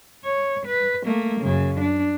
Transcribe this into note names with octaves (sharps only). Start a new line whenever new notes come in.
C#5
B4
A3 A#3
F#2 C#3
D4